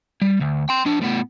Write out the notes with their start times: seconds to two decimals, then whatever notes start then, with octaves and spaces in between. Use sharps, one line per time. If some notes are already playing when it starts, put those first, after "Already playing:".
0.22 G3
0.41 D2
0.69 G5 C6
0.86 F3 D4
1.02 A2 B3